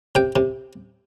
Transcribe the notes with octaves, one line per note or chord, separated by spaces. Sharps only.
C3 G5
C3